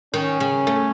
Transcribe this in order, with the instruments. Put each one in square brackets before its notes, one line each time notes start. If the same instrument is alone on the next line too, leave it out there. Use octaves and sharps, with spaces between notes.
[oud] D#3 [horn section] C#4
[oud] C#3
A3